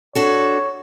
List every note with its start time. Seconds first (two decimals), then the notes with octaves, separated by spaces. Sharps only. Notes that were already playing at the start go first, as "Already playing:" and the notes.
0.15 D4 F#4 A4 C#5